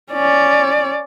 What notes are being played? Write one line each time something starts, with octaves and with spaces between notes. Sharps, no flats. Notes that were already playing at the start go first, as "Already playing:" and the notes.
C#4 D5